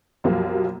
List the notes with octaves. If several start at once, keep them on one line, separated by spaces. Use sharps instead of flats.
B1 F#2 F3 G3 A#3